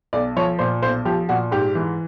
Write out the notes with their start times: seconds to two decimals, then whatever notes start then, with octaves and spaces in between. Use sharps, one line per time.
0.13 B1 D5
0.36 F3 C#5
0.59 A#2 C5
0.82 B1 C5
1.05 F3 G4
1.29 A#2 F#4
1.51 G#2 G4
1.75 E3